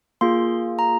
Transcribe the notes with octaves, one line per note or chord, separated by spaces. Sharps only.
A#3 F4 G#4 C6
A#5